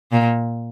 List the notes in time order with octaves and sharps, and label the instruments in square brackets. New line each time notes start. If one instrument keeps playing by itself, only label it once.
[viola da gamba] A#2